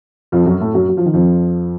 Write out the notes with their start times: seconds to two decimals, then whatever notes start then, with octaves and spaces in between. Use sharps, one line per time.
0.32 F2 F3
0.46 F#2 F#3
0.60 A2 A3
0.74 F#2 F#3
0.89 F#3
0.97 F3
1.06 D#3
1.14 F2 F3